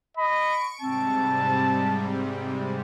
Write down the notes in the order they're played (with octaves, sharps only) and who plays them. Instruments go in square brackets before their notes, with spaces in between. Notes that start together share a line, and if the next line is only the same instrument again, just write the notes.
[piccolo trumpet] D#5 [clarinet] B5 [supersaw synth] C#6 D7
[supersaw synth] G#2 C3 G3 [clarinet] C4 [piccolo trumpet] A5